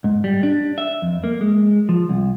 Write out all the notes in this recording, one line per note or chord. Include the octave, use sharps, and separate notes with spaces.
G#2
G3
D4
E5
F2
A#3
G#3
F3
C2